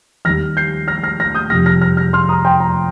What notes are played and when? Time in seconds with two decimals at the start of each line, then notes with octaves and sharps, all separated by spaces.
0.25 D#2 D#3 G3 F6 A#6
0.57 G6 C7
0.88 F6 A#6
1.03 F6 A#6
1.20 F6 A#6
1.35 D#6 G6
1.50 F2 C3 G3 F6 A#6
1.66 F6 A#6
1.81 F6 A#6
1.97 F6 A#6
2.13 C6 F6
2.29 A#5 D#6
2.45 G5 C6
2.60 A#5